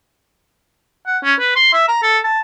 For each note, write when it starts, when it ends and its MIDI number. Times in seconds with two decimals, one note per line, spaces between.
1.07 1.18 78
1.24 1.34 61
1.39 1.53 71
1.56 1.73 84
1.73 1.87 76
1.88 2.00 82
2.03 2.19 69
2.24 2.41 81